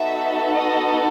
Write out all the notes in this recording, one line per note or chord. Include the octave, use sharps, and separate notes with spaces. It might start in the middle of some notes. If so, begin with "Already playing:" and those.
Already playing: B3 D#4 F#4 A4 E5
D#5